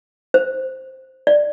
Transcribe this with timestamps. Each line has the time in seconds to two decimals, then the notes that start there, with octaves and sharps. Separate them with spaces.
0.34 C5
1.27 D5